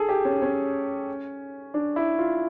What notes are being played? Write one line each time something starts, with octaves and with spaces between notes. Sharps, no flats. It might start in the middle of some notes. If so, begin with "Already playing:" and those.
Already playing: G#4 A4
G4
C#4
C#4
D4
E4
F4